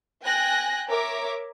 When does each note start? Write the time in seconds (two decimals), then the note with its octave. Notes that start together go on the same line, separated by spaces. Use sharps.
0.23 G5 G#5 F#6 A#6
0.87 A#4 C#5 E5 D6